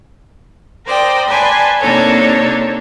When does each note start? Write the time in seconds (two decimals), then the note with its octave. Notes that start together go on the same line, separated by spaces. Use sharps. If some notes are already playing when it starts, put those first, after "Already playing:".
0.85 A#4 C5 D5 G5 D#6
1.27 B4 D5 G#5 A5 C6 G#6
1.79 C3 A#3 D4 D#4 A4 C#5